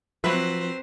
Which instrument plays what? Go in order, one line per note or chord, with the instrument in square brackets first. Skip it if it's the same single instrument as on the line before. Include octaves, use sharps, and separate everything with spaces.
[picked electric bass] F3 [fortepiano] F#3 E5 [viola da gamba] C4 C5 [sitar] B4